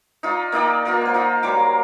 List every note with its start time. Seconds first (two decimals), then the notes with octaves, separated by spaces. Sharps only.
0.23 D#4 F4 D5
0.52 A#3 D#4 D5 G5
0.85 A#3 F4 A#4
1.01 C5 F#5
1.14 D#4 F4
1.43 F#3 G3 A#3 D6